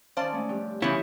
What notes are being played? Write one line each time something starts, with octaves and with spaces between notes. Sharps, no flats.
D#3 C#4 C5 D5 F5 A5
G#3 A3 C#4
G2 C3 F3
C#3 E3 B3 E4 C#5 G6